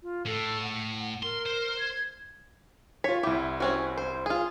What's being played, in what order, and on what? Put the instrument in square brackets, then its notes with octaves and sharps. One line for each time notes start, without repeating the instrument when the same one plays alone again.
[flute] F4
[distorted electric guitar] A2 [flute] A4
[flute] F#5
[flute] A#4 [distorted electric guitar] C6
[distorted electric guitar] C5
[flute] G#6
[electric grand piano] F4 B6 [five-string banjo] C#5
[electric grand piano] C2 E4 [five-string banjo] G4
[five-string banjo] C4 C#4 F#4
C5
F4 G#4